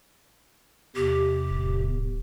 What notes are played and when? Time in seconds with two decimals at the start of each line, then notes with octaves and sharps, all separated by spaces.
0.96 E2 C3 G4
1.50 D1